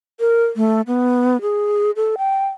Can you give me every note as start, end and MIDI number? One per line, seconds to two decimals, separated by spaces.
0.20 0.46 70
0.56 0.81 57
0.87 1.41 59
1.42 1.91 68
1.96 2.15 69
2.18 2.48 79